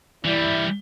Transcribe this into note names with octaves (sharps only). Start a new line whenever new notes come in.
E3 G3 E4 D5